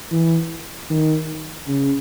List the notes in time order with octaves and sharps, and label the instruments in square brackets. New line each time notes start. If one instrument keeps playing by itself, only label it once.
[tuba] E3
D#3
C#3